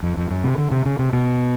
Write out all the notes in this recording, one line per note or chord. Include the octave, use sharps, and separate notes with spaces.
F2
F2
F#2
C3
D3
C3
C#3
C3
B2